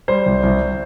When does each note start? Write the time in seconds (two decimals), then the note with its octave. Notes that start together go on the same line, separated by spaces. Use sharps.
0.08 G3 C5
0.26 C2
0.43 C2